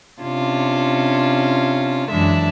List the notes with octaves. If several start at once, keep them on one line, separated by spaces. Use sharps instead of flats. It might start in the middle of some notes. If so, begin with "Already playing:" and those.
C3 C#4 D4 F4
F#2 E3 G#3 D4 E5